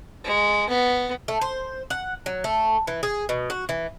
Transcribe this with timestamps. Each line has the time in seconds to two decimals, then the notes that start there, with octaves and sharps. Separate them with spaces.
0.24 G#3
0.69 B3
1.28 A3
1.42 C5
1.90 F#5
2.26 F#3
2.44 A3
2.87 E3
3.03 G#4
3.29 B2
3.50 F#4
3.69 E3